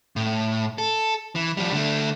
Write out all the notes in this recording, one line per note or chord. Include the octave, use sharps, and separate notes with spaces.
A2
A4
E3
F3 G3
D3 A3